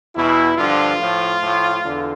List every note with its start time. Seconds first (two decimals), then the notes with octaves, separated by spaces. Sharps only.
0.15 E2 B2 E4
0.57 G2 D3 F3 F4
0.99 A2 F3
1.41 A2 F3
1.83 E2 D3